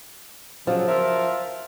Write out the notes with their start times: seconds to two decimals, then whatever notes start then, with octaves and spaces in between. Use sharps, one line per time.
0.67 C#3 F3 F#3
0.87 F4 A#4 E5